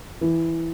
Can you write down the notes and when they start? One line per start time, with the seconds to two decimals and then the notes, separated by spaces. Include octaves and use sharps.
0.21 E3